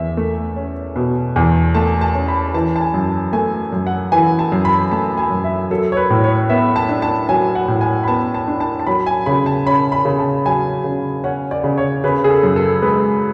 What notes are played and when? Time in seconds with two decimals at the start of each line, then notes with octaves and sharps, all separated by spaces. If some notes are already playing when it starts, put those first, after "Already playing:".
Already playing: E2 E5
0.17 A3
0.56 C#4
0.96 B2
1.36 E2
1.74 A3 A5
2.01 A5
2.15 C#4
2.28 B5
2.54 E3 A5
2.76 A5
2.81 G#5
2.94 F#2
3.33 A3 G#5
3.73 F#2
3.87 F#5
4.12 E3 G#5
4.39 A5
4.52 F#2
4.65 B5
4.91 A3 A5
5.17 G#5
5.31 F#2
5.44 E5
5.70 F#3 A4
5.92 C#5
5.97 B4
6.10 A2
6.24 C#5
6.49 B3 E5
6.76 A5
6.89 D4
7.02 A5
7.29 F#3 G#5
7.55 F#5
7.68 A2
7.81 G#5
8.03 B5
8.08 B3 A5
8.34 A5
8.48 D4
8.60 A5
8.79 A5
8.87 F#3 B5
9.06 G#5
9.26 C#3 B5
9.46 A5
9.67 C#4 B5
9.92 B5
10.05 C#3
10.19 A5
10.45 F#3 G#5
10.84 C#3
11.24 C#4 F#5
11.51 D5
11.64 C#3
11.78 C#5
12.04 C#3 B4
12.24 G#4
12.30 A4
12.43 F#2
12.56 A4
12.82 G#3 B4